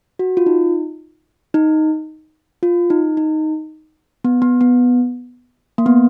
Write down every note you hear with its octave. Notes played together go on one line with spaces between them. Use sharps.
F#4
F4
D#4
D#4
F4
D#4
D#4
B3
B3
B3
A#3
B3